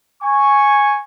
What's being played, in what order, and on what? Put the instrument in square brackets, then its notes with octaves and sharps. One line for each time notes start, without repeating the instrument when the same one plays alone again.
[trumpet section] G#5 C#6